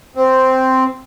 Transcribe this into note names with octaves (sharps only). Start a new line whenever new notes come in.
C4